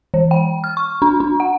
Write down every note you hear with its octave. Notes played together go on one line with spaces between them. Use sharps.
E3
G5
F6
C#6
D4
D4
F#5